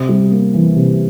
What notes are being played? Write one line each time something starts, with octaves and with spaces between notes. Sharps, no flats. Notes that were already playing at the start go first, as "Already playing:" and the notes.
Already playing: C3
G3
A#3
E3
C3